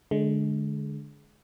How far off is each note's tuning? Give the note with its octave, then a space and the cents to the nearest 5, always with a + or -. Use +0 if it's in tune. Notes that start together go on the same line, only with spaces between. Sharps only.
D3 +0 G#3 +25